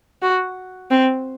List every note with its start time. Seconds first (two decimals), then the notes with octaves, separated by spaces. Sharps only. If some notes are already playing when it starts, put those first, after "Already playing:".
0.22 F#4
0.91 C4